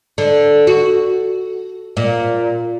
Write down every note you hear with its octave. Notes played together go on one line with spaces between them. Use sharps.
D3
F#4
A#2